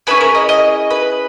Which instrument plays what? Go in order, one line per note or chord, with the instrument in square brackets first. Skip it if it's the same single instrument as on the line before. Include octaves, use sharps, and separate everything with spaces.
[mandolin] C#4 E4 G#4 B4
A#4
D#5
D#5
B4